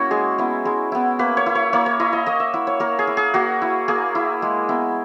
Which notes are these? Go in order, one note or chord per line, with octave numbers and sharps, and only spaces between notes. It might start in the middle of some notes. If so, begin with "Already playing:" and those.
Already playing: A#3 C#4 E4 F#4
G#3 G#4
B3 E4
G#3
B3 E4
A#3 B4
C#5
E4
C#5
A#3 C#5
C#5
E4 D#5
D#5
A#3 D#5
E5
E4 F#5
C#5
A#3 A#4
G#4
E4
G#4
A#3 F#4
E4
A#3 G#4
E4
G#3
B3 E4